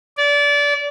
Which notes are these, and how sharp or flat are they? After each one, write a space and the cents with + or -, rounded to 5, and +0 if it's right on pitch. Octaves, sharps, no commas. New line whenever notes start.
D5 -25